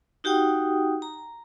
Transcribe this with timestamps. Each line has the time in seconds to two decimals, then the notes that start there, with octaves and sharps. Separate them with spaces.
0.24 D#4 F#4 G4 F#5 G5 D#6
1.02 A#5